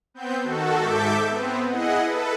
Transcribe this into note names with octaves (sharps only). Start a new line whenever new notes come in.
B3 C4 G6
D#3 F#4 A4
G#2 A4 E5 D6 G6
B3 C4
E4 G#4 D#5 F#5
A4 B4